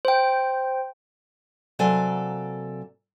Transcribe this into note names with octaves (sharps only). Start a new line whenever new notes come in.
C5 G5
C3 F#3 A#3 A4 D5 G#5